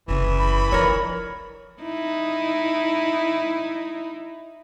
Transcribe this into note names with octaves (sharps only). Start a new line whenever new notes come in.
F#1 C#3 E3
B5
D3 F3 A#4 C#5
D#4 E4